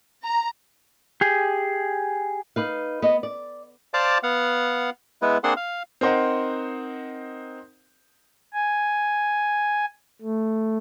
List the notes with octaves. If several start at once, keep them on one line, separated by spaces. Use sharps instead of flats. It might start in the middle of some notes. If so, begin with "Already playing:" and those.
A#5
G4 G#4
D#4 B4 F5
B3 D#5
D5
C5 D5 F5 A5 D6
B3 F5 F#5
G#3 B3 E4 B4
A#3 C4 D4 G#4 F#5 C6
F5
C4 D#4 A#4 C5 D#5 F#5
G#5
A3